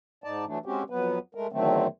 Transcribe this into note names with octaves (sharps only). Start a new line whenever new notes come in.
G#2 D#4 D5 A5
E3 F#3 A3 D4
G#3 C4 C#4 F#4 G4
F2 F#3 B3 B4
G#3 A3 A#4
E2 D3 D#3 F#3 A3 C4